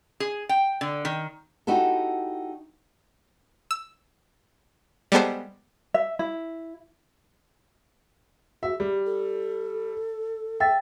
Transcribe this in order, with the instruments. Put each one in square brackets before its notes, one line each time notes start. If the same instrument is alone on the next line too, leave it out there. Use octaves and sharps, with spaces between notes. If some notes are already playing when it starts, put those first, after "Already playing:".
[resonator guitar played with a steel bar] G#4
G5
D3
D#3
[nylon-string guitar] D#4 E4 F#4 G4 A4
[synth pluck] E6
G3 G#3 B3 A4 C5
[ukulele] E5
E4
[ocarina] F#4 [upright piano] E5
[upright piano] G3 [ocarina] G4
[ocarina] A4
[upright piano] E5 [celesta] G5 A6